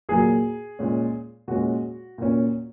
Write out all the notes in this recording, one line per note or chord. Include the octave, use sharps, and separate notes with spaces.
A#2 F#3 A#3 G#4
A#2 G#3 C#4
A#2 G#3 C#4 F#4
A#2 A#3 C#4